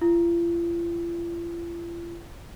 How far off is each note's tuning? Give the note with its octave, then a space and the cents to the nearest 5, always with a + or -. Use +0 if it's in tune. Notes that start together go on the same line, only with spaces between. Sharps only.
F4 -45